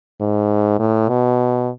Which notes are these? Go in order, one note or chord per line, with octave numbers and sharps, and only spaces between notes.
G#2
A2
B2